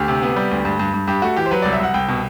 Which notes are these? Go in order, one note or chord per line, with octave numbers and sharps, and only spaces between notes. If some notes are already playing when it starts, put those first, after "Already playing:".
Already playing: D2 G4
C3
B3
G3
D2
G2
G2
G2
G2 G4
A3 F#4
E3 G4
C5
F#3 B4
C2 D5
E5
C2 F#5
C2 G5
B2